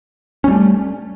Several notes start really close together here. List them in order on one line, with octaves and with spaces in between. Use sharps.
C#4 G3 A3